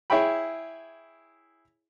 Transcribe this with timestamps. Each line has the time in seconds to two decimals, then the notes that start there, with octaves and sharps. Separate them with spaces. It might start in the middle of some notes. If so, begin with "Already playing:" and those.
0.10 E4 G#4 C#5 E5 G5 B5